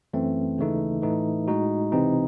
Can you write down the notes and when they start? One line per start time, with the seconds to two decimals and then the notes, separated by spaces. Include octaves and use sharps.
0.13 F#2 E3 A3 C4
0.58 D#2 C#3 E3 A3 D#4
1.02 A2 E3 A3 D#4
1.48 A2 G#3 D#4 F#4
1.92 C#2 C3 E3 C4 D#4